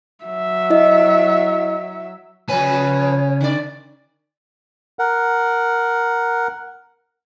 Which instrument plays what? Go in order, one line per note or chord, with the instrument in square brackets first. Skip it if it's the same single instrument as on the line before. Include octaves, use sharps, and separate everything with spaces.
[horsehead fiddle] F#3 E5
[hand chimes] E4 D#5
[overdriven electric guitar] C#3 G#5 [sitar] F3 B4 [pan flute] C#5
[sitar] D3 D5
[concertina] A#4 F#5